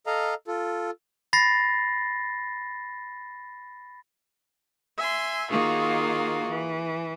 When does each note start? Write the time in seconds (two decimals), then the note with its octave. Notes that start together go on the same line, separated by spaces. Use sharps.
0.06 A4 D#5 F5 A#5
0.47 F4 A4
1.33 B5 A6 A#6 C7
4.97 E5 G#5 C6
5.50 D#3 A#3 F4 F#4 G#4
6.49 E3